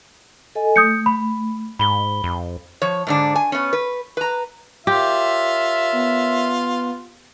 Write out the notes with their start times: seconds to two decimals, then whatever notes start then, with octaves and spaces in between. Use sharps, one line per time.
0.55 A4 D#5 G#5
0.76 A3 D#6 G6 C#7
1.06 B5
1.79 G#2 B5 G7
2.24 F2
2.82 F3 C#5
3.07 G#2 D3 D4
3.36 G#5
3.52 B3 C#4
3.73 B4
4.17 B4 A#5
4.87 F4 G4 A#4 C#5 E5
5.93 B3